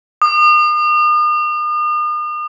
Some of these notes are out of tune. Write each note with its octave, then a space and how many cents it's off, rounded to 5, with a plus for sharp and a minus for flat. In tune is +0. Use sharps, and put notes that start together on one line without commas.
D#6 -40